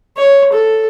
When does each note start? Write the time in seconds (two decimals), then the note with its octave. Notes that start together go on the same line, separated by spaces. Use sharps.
0.17 C#5
0.53 A4